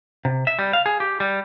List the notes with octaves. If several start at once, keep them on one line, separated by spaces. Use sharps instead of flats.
C3
E5
G3
F5
G#4
G4
G3